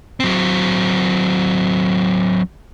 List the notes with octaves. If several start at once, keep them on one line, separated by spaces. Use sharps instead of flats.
F#3 C4